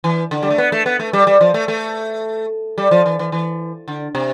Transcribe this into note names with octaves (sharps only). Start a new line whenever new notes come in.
E3
D3
G3
A3
B3
A3
B3
A3
G3
G3
F3
A3
A3
G3
F3
E3
E3
E3
D3
C3